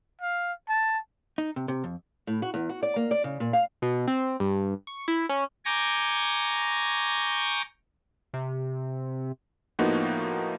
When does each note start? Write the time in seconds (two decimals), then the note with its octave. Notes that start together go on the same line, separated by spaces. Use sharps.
0.22 F5
0.69 A5
1.38 D#4
1.56 C3
1.68 C3
1.84 F2
2.27 A2
2.42 F#4
2.54 E2
2.69 F#4
2.83 D5
2.96 A#3
3.11 D5
3.24 C#3
3.40 A#2
3.53 F5
3.82 B2
4.08 C4
4.40 G2
4.87 C#6
5.08 E4
5.29 C#4
5.65 G#5 A#5 C#6 D6 G6 A#6
8.34 C3
9.79 A2 F3 A#3 B3 D#4 F#4